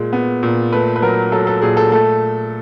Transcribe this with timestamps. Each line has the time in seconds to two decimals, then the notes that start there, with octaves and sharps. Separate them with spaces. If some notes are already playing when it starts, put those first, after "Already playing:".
Already playing: A#2 G#3
0.13 B3
0.43 A#2
0.73 A3 B4
0.96 B4
1.02 F#3 A#4
1.32 F#3 A4
1.47 A4
1.62 A#2 G#4
1.77 A4
1.92 A3 A4